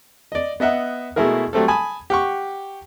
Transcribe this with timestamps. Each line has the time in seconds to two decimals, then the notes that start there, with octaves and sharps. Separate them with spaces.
0.32 D5 D#5
0.60 B3 D#5 E5 F#5
1.16 B2 G#3 A3 E4 G#4 A#4
1.53 F#3 G3 A3 C4 A4
1.68 G#5 A5 B5 D#6
2.10 G4 F#5 C#6